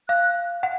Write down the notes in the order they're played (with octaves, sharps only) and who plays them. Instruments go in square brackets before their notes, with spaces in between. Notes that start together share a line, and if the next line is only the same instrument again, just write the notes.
[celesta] F5 [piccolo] F#6
[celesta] F#5